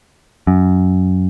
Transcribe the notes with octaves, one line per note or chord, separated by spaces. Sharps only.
F#2